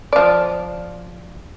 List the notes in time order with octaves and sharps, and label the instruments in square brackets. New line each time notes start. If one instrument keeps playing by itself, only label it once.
[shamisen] F3 D5